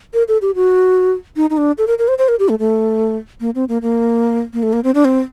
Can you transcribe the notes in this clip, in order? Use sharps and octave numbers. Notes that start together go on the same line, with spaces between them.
A#4
A4
G4
F#4
D#4
D#4
D4
A4
A#4
A#4
C5
C5
A#4
G4
A3
A3
A#3
C4
A#3
A#3
A#3
A3
A#3
C4
D4
C4